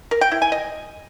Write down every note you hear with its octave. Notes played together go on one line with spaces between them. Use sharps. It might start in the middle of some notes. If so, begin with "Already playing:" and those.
A#4
G5
E4
G#5
D#5